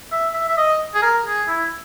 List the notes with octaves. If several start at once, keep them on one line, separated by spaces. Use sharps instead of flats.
E5
E5
E5
D#5
G#4
A#4
G#4
E4